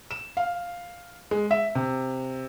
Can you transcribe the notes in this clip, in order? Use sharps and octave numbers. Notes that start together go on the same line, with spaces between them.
E7
F5
G#3
E5
C3